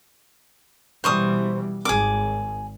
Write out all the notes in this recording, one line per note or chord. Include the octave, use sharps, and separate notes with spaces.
B2 E3 G3 C5 C#6 D#6
G#1 G#2 G#4 D6